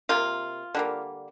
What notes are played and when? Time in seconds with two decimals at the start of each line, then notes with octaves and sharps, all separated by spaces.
0.09 C3 A#3 F4
0.75 D3 G3 A#3